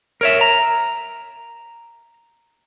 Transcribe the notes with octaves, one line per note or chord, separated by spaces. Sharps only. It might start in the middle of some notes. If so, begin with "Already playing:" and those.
A#4 C#5 E5
A#5